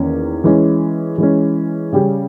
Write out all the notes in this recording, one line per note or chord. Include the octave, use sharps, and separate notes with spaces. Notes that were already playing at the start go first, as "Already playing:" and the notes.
Already playing: E2 D#3 A#3 C#4
E3 G#3 C#4
E3 G#3 C#4
C#3 G3 C#4 G4